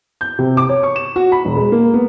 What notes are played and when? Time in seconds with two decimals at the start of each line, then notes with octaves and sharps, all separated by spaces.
0.21 G6
0.39 C3
0.57 D6
0.69 C#5
0.83 C#6
0.96 E7
1.16 F#4
1.32 B5
1.45 E1
1.56 G#3
1.72 A#3
1.94 B3